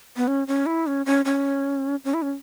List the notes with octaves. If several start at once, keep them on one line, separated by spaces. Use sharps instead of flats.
B3
C#4
C#4
E4
C#4
C#4
C#4
C#4
E4
C#4